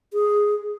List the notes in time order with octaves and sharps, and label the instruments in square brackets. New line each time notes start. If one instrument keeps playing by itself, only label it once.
[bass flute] G#4